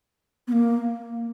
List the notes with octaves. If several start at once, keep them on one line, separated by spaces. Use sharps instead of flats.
B3
A#3